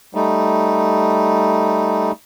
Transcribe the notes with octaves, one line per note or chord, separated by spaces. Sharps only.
G3 A3 D#4